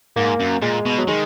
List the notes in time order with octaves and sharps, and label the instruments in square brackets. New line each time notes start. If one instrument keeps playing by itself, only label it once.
[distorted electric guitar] G#2 [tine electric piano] A#3
[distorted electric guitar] F#2
[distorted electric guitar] A#2 [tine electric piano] G#3
[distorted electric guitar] B2
[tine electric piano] F#3
[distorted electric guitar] D#3 [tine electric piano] G#3